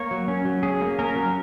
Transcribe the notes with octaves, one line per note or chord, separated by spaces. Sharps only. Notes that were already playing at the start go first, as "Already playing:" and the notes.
Already playing: A#3 C#5
F#3
C#4
F#3
C#4 G#4
A#3
C#4 A#4
F#3